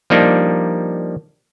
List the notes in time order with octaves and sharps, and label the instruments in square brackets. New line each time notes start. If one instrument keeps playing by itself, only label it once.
[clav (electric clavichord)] F3 G3 A#3 D4 D#4